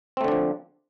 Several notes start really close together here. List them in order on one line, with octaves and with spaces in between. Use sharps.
C4 A3 D3 D4 F3